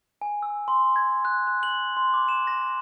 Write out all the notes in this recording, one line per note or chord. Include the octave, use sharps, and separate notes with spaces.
G#5
E6
C6
G#6
F#6
F#6
F#7
C6
D6
E7
A#6